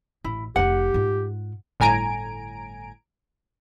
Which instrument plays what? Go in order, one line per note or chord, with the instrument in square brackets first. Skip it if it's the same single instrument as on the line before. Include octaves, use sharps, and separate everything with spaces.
[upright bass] A1 [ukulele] E4
[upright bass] F1 D#4 [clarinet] G4 [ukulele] F#5
[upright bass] G#2 F4
[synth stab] G1 A2 G#5 A#5 D7